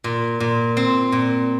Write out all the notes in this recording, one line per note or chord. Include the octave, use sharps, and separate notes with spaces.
A#2
A#2
C4
A#2